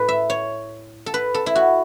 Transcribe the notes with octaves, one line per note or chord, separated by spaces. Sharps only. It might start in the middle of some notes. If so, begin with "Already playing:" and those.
Already playing: A2 A4 B4
E5
C#5
A4
B4
A4
E4
F#4